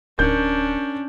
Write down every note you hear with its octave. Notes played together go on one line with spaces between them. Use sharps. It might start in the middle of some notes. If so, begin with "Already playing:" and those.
D1 C#4 D4 A#4 G6